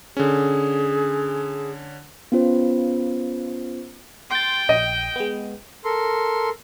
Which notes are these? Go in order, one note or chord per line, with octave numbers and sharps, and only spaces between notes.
D3 C#4 G#4
B3 C#4 F4 C5
G5 C6 A6
A#1 D#5
G#3 B3
A4 A#4 C6